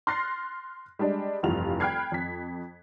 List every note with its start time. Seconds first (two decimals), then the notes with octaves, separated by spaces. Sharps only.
0.07 C6 F6 F#6 A6 A#6 C7
0.99 G3 G#3 D4
1.43 F1 G2 E3 F4 F7
1.80 G5 B5 F6 F#6 G#6 C7
2.12 F2 B6